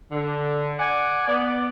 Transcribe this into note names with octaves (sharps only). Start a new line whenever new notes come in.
D3
D5 F#5 G#5
B3 D5